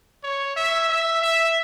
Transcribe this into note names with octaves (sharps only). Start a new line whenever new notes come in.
C#5
E5
E5
E5